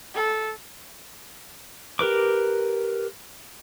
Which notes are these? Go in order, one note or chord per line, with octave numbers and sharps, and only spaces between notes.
A4
G4 A#4 B4 D6